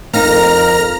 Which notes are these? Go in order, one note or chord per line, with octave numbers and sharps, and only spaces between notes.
F2 C4 D#4 A#4 F5 A#5 F6 A#6